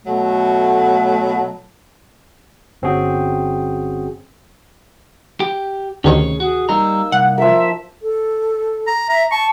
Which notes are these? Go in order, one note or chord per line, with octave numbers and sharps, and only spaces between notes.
B2 F#3 A3
G1 C4 C#4 F#4 G#4 G5
G4 G5
D2 C3 D#3 C#4 G#4 C#5
F#4 G#4
G3 A#3 D#4 A#5 E6
C2 F#5
F3 A#4 E5
A4
A#5
E5 A#5
A5 C#6